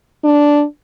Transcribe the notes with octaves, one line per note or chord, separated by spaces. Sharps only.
D4